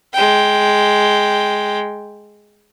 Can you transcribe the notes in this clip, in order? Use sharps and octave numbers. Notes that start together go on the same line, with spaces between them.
G#3 G5